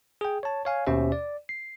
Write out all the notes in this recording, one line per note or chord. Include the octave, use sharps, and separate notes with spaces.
G#4 G5
C#5 A5
C#5 F5 G#5
D#2 B2 C#4 G4 C5 E5
D5
C7